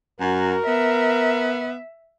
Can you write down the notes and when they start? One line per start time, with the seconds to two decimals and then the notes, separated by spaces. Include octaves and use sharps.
0.20 F#2 F#4 A#4
0.68 B3 E5